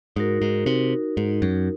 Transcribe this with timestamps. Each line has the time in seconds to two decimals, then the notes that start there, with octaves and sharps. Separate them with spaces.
0.16 G#2 D#4 F#4 A#4
0.42 G#2
0.66 C3
1.17 G#2
1.42 F#2